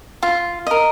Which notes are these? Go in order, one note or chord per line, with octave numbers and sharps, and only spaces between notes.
F4
A#4 D#5